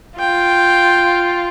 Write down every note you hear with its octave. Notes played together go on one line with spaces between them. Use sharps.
F4 G5